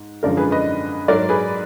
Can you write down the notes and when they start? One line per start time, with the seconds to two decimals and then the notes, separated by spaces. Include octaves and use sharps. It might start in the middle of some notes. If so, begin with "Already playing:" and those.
Already playing: G#2
0.23 F#2 D3 F3 G#3 A#4 D5
0.37 G#4 B4
0.51 B4 D#5
1.08 G#2 F#3 A#4 D5
1.29 G#4 B4